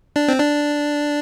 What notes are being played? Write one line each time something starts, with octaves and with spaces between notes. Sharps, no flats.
D4
C4
D4